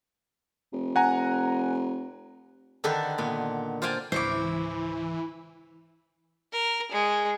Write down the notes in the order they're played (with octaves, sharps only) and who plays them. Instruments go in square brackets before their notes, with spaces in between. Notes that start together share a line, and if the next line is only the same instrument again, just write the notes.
[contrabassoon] F1
[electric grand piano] F#5 G#5 A#5
[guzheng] D3 D#3 D4 D#4 A4 B4
A#2 B3
F4 C5 D5 F5 G5 G#5
[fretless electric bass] G#1 C#2 [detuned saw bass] E3 [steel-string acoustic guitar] E4 [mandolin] C5 C#6 D6
[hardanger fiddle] A#4
G#3